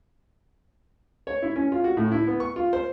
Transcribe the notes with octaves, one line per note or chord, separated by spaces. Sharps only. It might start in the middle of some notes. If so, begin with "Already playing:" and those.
C#5
E4
C#4
F4
F#4
A2
E4
B3
C#6
F4
C5